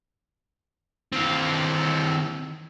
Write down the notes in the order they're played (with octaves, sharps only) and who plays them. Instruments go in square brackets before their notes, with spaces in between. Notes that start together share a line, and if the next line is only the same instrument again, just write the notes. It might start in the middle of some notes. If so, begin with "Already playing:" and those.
[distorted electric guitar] D#3 F5 [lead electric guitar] E3 C4